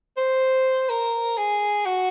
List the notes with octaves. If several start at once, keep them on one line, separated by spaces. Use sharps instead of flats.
C5
A#4
G#4
F#4